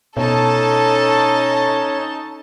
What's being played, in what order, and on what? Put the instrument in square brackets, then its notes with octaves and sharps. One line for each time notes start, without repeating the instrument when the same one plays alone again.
[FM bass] B2 [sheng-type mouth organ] C#4 [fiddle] D#4 A5 [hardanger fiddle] A4